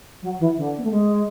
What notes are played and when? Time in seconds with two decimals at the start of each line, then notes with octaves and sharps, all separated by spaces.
0.22 F#3
0.39 E3
0.57 D3
0.77 B3
0.83 A3
0.91 G#3